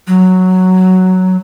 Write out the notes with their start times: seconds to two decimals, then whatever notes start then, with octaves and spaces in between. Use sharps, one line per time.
0.07 F#3